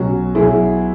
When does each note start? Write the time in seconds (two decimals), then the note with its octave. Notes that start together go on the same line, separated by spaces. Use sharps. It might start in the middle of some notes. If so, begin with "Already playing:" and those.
Already playing: B1 B2 F#3 C#4 F#4
0.35 B1 B2 F#3 E4 G#4